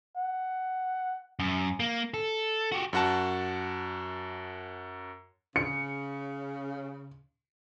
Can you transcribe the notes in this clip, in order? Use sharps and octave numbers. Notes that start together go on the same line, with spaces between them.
F#5
F#2
A#3
A4
F#4 G4
F#2 F#4 A5
C#3 C#7